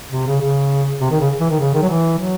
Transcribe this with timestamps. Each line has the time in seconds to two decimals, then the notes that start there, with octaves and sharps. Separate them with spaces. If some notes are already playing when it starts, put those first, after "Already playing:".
0.12 C3
0.26 C#3
0.41 C#3
1.00 C3
1.11 D#3
1.20 C#3
1.40 E3
1.50 D#3
1.60 C#3
1.74 D#3
1.82 F#3
1.89 E3
2.18 F#3